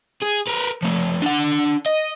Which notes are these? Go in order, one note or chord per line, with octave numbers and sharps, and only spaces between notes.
G#4
A#4 B4
F3 A3
D4 F#5
D#5